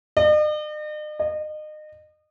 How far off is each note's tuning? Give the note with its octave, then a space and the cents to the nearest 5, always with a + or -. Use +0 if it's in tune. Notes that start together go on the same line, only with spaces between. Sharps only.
D#5 -45
D#5 -30